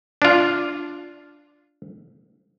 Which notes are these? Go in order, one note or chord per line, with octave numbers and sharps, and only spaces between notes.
D4 F4